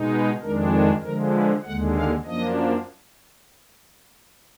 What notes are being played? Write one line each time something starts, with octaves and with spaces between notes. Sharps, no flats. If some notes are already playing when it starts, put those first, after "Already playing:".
Already playing: B2 G#3 D#4
B4
F2 D#3 G#3 D4 A#4
G#4
D3 F3 G#3 A#4
B4
D#2 D3 G#3 F#5
F5
F#2 F3 A#3 D4 D#5